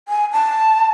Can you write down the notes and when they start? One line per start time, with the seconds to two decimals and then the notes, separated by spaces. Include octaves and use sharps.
0.08 G#5
0.33 A5